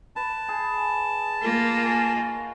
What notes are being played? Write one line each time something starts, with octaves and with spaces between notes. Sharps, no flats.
B4 A5
G#4
A#3 F4
G#5
F5 F#5 C#6